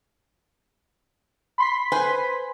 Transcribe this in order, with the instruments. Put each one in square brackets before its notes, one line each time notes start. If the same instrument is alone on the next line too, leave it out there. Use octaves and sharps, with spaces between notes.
[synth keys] B5 C6 B6
[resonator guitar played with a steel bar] B4 C5 G#5